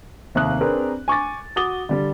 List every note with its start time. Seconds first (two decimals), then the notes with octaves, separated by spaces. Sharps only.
0.35 F1 D#2 A#3 E5 D#6 F#6
0.61 C4 D4 G#4 A#4 B4
1.08 G#5 C#6 D6 A6
1.56 F#4 D6 D#6 A6 G7
1.89 D3 G3